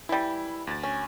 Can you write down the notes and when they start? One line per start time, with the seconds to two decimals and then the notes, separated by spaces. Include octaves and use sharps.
0.09 E3 G3 E4
0.67 D2 A6
0.83 C#4